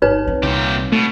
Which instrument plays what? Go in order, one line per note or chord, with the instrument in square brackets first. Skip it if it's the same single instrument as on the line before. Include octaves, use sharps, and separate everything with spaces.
[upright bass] G1 [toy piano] D#4 B4 C#5
[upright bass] C4
[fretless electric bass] C2 [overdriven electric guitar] A#2 G4
[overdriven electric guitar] B2 [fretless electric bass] A3